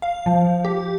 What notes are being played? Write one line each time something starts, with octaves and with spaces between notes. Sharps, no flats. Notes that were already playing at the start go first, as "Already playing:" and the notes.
F5
F3
G4